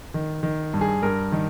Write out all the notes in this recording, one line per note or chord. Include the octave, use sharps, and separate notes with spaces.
D#3
D#3
G2
G#4
G2 A#4
D#3